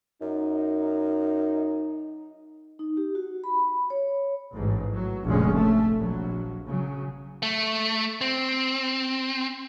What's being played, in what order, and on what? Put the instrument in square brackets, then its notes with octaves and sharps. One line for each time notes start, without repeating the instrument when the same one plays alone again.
[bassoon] F#2 [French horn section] D#4
[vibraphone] D#4
G4
F#4
B5
C#5
[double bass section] A1 G#2
F#3
F1 A#1 C#3 G#3 C#4
A3
A#1 F#3
C#3 F#3
[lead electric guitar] A3
C4